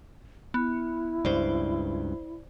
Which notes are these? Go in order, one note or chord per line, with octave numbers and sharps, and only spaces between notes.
B3 E4
C#2 G2 C5 D5